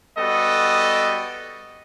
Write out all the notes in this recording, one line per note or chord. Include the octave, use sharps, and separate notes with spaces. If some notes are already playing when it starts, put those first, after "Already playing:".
G3 B3 F#4 A4 D#5